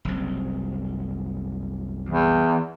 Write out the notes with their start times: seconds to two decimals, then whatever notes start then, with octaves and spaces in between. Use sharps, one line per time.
0.05 F#1 C2
2.09 E2